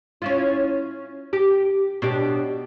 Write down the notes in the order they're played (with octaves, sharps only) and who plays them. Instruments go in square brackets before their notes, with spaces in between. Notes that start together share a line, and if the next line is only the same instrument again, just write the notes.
[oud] C#4 E4 F4
G4
B2 D4 G4